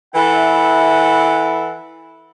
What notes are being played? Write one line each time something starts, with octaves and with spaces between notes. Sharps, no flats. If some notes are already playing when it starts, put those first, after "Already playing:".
E3 E4 A4 E5 F#5